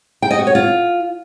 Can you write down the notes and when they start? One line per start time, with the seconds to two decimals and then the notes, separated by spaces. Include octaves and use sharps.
0.22 G5
0.31 D#5
0.39 F#4
0.47 C#5
0.55 F4